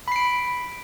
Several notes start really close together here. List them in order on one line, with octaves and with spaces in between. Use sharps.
B5 C7 D7